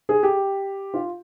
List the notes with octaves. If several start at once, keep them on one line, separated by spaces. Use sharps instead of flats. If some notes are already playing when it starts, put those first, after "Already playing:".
G#4
G4
F4